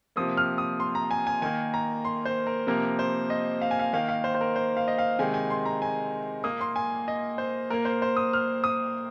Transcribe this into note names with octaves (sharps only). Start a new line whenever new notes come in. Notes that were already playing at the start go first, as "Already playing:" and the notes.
C3 F3 A#3 D#6
F6
D#6
C6
A#5
G#5
G#5
D#3 A#3 G#5
A#5
C6
C5
A#4
C3 F3 A#3 A#4
C5
D#5
F5
G#5
F5
D#3 A#3 F5
F5
C5
C5
A#4
C5
F5
D#5
F5
C3 D#3 G#3 G#5
G#5
C6
A#5
G#5
A#2 A#3 D#6
C6
G#5
D#5
C5
A#2 A#3 A#4
C5
C5
D#6
F6
D#6